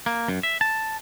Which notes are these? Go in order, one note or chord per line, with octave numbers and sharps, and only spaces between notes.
A#3
F#2
E5
A5